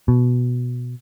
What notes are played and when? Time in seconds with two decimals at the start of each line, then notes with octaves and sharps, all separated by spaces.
0.08 B2